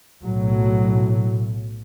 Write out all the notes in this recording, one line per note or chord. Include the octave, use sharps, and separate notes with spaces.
B1 A2 F#3